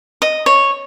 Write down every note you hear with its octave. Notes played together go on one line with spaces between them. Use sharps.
D#5
C#5